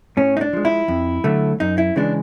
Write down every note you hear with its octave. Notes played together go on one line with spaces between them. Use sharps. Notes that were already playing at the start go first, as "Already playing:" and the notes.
A2 C#4
D#4
D4
F3 G#3
E4
F2
D3 F#3 A3
F#2 D#4
E4
C#3 E3 G#3 D4